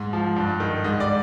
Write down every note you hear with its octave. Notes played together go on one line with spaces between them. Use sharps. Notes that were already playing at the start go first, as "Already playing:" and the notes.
Already playing: G#2
F3
G2
D#3
G#2 D#5
D5